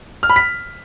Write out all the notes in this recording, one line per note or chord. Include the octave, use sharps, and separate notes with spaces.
F6
B5
B6